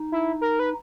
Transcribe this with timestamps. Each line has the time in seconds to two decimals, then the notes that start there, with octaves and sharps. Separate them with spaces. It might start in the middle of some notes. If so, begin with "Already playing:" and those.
Already playing: D#4
0.12 E4
0.41 A#4
0.59 B4